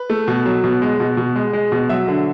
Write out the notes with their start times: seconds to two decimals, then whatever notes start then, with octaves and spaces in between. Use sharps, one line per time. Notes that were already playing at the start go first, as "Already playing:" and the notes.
Already playing: B4
0.10 A3
0.28 B2
0.46 F#3
0.64 B2
0.82 G#3
1.00 B2
1.17 B2
1.36 G#3
1.53 G#3
1.72 B2
1.89 F#3 E5
2.08 D3